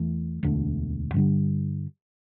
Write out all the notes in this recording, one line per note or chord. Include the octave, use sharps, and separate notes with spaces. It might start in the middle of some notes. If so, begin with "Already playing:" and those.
Already playing: E2 E3 A3
E1 D2 D3 A3
G2 D3 G3